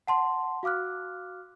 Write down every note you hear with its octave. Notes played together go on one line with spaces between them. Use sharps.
F#5 A5 C6
F#4 F5 D6 F6 F#6